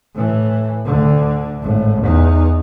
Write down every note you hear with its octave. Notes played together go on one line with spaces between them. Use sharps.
A2 E3
D2 D3
G#1 A2
E2 D#4